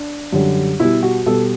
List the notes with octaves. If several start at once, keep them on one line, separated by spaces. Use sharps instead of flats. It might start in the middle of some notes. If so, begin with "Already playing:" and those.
Already playing: D4
F#2 D3 G3
B2 G3 E4
F#4
B2 G3 A4